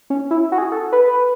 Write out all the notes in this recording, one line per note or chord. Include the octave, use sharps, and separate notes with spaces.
C#4
E4
F#4
G#4
A4
B4